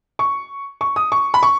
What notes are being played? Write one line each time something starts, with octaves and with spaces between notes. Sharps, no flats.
C#6
C#6
D#6
C#6
B5
C#6